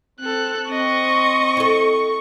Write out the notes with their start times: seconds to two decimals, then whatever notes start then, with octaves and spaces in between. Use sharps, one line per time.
0.20 C4 A4 F#6
0.70 C4 D#5 C#6
1.57 E4 A4